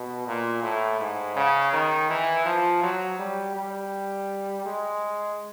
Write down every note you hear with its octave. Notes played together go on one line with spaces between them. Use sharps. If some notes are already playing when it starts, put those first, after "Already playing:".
Already playing: B2
A#2
A2
G#2
C#3
D#3
E3
F3
F#3
G3
G3
G#3